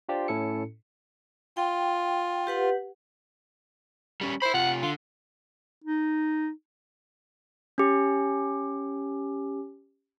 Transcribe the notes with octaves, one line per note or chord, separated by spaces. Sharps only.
D4 F4 G4 C5 D5
A2 C#4 E4 A4 C#7
F4 G5
G4 B4 F#5
G3 C#4
C5 E5 B5
C3 F4 F#5
D3 F4
D#4
C#4 G4